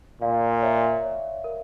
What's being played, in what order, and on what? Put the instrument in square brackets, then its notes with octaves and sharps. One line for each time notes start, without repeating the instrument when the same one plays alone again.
[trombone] A#2 [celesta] D5 F5
[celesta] C#5 E5
C#5
A#4